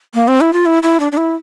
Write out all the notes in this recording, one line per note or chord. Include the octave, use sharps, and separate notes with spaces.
A#3
C4
E4
F4
E4
E4
D4
D4
E4